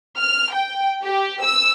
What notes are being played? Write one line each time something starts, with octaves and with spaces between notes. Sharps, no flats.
F6
G5
G4
E6